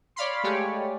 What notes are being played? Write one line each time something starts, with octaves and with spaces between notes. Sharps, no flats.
C#5 D5 F5 B5 C6
G#3 A3 G4 C#5 D5 G#5